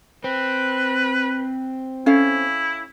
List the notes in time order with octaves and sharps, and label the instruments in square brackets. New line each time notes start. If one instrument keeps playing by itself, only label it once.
[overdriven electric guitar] C4 [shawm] B4
[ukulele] C#4 A4 F5 [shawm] E4